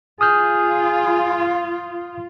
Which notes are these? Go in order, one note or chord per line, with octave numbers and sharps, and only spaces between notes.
F4 G#4 D#6 F6 G6